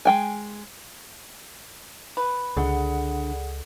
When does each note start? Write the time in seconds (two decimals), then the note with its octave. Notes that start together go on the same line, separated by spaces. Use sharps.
0.05 G#3 G5 G#5
2.17 B4
2.57 C#2 D3 G#4 F#5